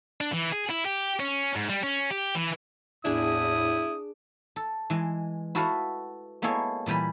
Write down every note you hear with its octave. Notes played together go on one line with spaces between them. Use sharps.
D4
E3
G#4
E4
G4
C#4
G#2
G3
C#4
G4
E3
E2 A2 D4 E4 G#4 D#6
A4
E3 G#3
E4 F#4 A4 B4 F5 F#5
G#3 A#3 B3 E4 A4 C#5
A#2 E3 G3 G#5 B5